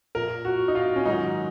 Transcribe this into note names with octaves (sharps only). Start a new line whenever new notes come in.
A#2 F3 A#4
F#4
D#4
F4
C#4
G#2 D#3 F#3 D#4